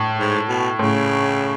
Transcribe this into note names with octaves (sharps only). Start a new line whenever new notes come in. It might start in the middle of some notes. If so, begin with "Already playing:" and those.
Already playing: A2
G#2
B2
A2 C#3